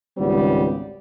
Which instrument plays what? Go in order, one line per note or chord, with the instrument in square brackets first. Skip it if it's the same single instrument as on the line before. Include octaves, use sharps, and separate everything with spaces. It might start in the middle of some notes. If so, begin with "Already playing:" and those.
[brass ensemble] G#1 C#2 G3 B3